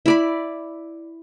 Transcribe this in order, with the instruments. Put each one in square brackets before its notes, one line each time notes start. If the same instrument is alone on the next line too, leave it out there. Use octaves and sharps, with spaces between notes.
[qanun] E4 D5 B5